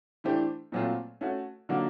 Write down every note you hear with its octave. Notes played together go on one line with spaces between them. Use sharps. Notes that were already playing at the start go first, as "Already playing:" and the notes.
E3 A3 D4 G4 C5
A#2 F#3 A3 C4 F4
A3 C#4 F#4
D3 F#3 A#3 D#4 F#4